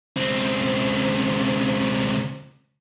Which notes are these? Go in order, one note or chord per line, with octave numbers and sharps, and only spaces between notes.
C#2 C4